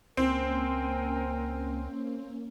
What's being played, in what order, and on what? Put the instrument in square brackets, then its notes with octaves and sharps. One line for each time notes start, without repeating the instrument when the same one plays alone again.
[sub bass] C#2 [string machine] A#3 C#4 [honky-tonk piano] C4 [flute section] A#4 G5 G#5